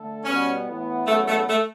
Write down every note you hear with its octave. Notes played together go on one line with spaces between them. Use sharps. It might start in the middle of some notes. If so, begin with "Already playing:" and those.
Already playing: D3 A3 A4
B2 G3 B3 C#4
A2 E3 B3 E4
E2 C#3 F#3 A3 B3
A3
A3